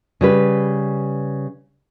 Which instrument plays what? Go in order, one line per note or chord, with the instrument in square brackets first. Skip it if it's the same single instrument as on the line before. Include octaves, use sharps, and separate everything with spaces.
[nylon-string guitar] C#3 G3 B4